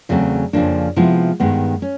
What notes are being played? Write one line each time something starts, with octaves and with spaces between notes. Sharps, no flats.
E2 C#3 F#3 A3 C4
F2 C#3 F3 A#3 D4
C3 F3 G#3 B3 E4
G2 D#3 G#3 B3
C#4